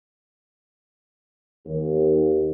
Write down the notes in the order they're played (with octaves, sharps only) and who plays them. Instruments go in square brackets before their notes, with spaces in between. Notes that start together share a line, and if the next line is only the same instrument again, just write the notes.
[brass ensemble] D#2